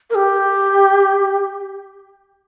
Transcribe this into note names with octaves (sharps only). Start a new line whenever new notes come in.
A#4
G4